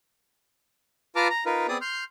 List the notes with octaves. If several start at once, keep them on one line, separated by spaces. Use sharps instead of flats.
F4 B4 A5 A#5 D6 F6
A#5
D#4 F4 A#4 B4
B3 C4 G#4 D5 D#6
C6 F6 G6